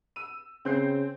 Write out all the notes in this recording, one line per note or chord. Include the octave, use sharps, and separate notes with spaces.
E6 D#7
C#3 C4 G6 C7